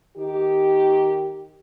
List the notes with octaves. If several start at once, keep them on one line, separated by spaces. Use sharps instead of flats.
D#3 G4